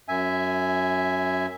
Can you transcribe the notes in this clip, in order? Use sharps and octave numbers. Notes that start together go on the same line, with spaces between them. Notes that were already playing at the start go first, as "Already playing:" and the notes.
F#2 E5 G#5